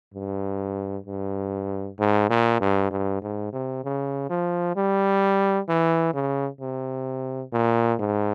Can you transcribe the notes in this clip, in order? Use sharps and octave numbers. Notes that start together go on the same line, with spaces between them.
G2
G2
G#2
A#2
G2
G2
G#2
C3
C#3
F3
G3
E3
C#3
C3
A#2
G#2